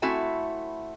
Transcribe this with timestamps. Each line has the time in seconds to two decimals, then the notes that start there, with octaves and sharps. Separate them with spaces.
0.02 A3 C4 E4 F#4 E5 G#5